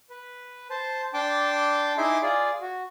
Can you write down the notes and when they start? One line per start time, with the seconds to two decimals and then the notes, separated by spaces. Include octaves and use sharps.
0.10 B4
0.70 C5 A5
1.14 D4 G5 A5 C6 D6
1.98 D#4 E4 G#4 E5 C6 D6
2.23 F4 G#4 D5
2.61 F#4